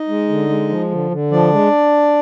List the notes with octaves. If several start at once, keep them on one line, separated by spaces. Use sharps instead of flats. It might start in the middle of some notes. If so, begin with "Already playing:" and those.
Already playing: D#4 D#5
G#3
D3
G#3
F3
D3
D3
F3 D4 D5
G#3